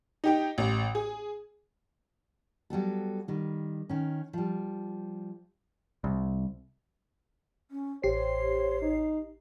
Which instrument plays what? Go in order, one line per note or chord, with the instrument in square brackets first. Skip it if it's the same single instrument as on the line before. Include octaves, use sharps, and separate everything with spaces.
[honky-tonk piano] D#4 G4 G5
A1
G#4
[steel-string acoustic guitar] F#3 G3 B3 A4
D#3 G3
D#3 C#4
F3 G3
[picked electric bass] C2
[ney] C#4
[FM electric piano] A1 G4 C7 [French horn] C5 [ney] C#5
[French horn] D#4